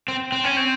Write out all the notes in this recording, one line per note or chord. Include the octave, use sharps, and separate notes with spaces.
C4
C4
C#4
C4